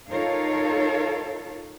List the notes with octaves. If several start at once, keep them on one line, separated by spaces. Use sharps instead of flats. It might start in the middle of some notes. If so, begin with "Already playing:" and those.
D#4 F4 A4 A#4 C#5 F5